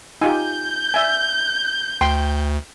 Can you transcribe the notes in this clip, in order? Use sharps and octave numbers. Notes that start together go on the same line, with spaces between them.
D#4 F4 G4 G#5 G6
D5 E5 G#5
D2 G5 C6